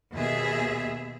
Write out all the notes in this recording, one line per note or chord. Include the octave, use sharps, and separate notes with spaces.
D#2 B2 G#4 E5